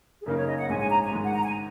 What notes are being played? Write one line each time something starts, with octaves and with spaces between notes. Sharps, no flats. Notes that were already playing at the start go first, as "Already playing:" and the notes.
G#4
F#2 C#3 A#3 D#4 A#4
C#5
D#5
F#5
A#1 G#2 G#3 C#4 G#5
G#5
A#5
G#5
G#2 D#3 G#3
F#5
A#5
G#5